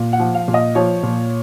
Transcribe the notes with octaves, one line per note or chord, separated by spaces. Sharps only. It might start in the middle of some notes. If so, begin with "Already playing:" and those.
Already playing: A#2
F#5
F3
F5
A#2
D#5
F3 C#5
A#2